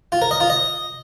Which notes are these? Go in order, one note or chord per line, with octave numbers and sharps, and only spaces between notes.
F4
A#4
D#5
F4
D#5